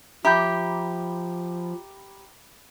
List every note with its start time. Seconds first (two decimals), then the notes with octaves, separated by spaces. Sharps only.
0.25 F3 G4 E5 A#5 B5 D6 G6